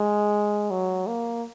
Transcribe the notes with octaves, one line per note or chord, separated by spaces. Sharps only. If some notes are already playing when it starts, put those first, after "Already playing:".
Already playing: G#3
F#3
A#3